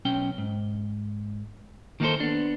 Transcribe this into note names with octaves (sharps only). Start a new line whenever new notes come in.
B1 C#4 G5
G#2
D#3 A#3 D#4 F#4 A4 C5
B3 D4